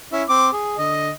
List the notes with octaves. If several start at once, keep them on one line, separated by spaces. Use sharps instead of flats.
C#4 E4
C4 D6
G#4
D3 D#5